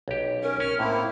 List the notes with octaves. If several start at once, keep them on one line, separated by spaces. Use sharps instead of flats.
B1 G4
C#4 A#4
C#4 F6
A2 A#3 C4 E4